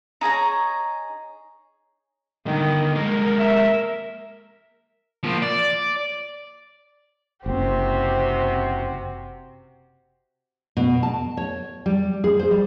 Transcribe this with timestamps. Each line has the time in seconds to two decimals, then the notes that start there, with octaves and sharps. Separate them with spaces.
0.21 D#4 G#4 C#5 A#5
2.46 D3 D#3 G3
2.95 G#3 A#3 A#4
3.39 E5
5.24 F3 A#3
5.43 D5
7.46 F#1 C3 C4 F#4 G4
10.77 B2
11.03 A5
11.37 C#5
11.86 G3
12.24 G#4
12.39 C5
12.51 G3